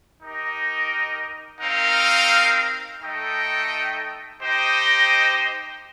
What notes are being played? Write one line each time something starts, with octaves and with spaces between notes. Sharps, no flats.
D#4 G4 A#4 D#5
C4 D#4 A#4 F5
A3 D#4 A4 D#5 G5
D#4 G4 C5 D#5 G5